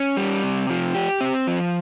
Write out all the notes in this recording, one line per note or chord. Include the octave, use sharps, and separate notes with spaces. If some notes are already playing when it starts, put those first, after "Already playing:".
Already playing: C#4
G3
C3
F3
G4
C4
F3